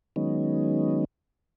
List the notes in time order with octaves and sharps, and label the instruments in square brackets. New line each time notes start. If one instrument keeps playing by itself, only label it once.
[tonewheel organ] D#3 F#3 G#3 B3 C#4 D#4